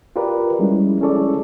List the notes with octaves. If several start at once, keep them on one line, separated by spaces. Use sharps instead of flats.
F4 G4 A#4 B4 D5
F3 G3 G#3 C#4 E4
C#4 E4 G#4 A4 C#5 D5